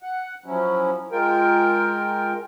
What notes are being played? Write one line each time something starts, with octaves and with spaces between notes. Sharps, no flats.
F#5
F3 F#3 C#4 E4
G#3 F4 A#4 G5